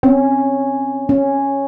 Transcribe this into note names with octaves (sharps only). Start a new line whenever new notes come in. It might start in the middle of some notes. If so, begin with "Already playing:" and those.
C4 C#4
C#4